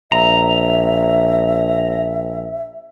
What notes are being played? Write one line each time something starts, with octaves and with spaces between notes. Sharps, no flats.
A#1 E5 A#5